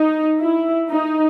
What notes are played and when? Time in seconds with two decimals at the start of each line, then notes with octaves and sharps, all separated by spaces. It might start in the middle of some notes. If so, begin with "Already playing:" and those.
Already playing: D#4
0.41 E4
0.91 D#4